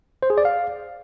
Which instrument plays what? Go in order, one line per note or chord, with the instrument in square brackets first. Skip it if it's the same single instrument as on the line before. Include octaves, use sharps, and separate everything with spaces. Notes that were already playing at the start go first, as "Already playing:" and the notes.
[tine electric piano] C5
G#4
D5
F5